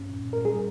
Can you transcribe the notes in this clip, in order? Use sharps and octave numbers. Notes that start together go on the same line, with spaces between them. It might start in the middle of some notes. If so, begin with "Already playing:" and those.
Already playing: G2 C#4
A#2
A#2
A#4
G3 G#4